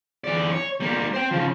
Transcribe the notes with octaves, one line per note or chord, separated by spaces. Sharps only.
E3 D5
C#5
G3 A#3
C5 G5
C#3 F3